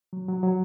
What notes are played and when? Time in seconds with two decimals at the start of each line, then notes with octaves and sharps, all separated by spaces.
0.13 F#3
0.29 F#3
0.43 F#3